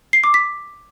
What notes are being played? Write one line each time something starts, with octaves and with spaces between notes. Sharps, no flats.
C7
D6
B6